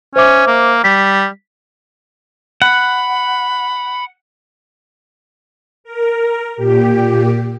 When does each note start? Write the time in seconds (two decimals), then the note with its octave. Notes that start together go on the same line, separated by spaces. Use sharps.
0.16 C#4 C5 E5 D6
0.47 A#3
0.84 G3 B6
2.62 F#5 B5
5.84 A#4
6.57 A#2 G4